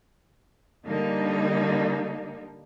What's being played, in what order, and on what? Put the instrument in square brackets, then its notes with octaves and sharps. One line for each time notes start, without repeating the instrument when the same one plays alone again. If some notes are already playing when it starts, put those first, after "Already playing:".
[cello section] D3 G3 A#3 D#4